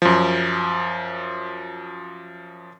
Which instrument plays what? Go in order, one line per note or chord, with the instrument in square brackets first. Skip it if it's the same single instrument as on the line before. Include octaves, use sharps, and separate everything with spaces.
[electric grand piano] F#2 F3